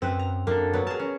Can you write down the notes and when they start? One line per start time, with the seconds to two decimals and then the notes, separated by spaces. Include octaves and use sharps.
0.02 F#2 C4 B4
0.19 A#5
0.47 F#2 A#3 D4 A4
0.73 F#3 B3
0.87 G#4 A#4 A5
1.00 C#4